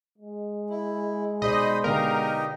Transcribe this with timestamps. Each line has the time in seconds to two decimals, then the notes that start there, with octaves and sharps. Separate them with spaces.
0.18 G#3
0.70 E4
1.42 B2 D#4 G#4 C5 D5 D#5 B5
1.84 D3 B3 D#4 G4 A#4 D#5 F5